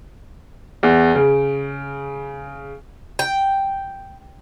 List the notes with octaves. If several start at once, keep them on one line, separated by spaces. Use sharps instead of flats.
E2
C#3
G5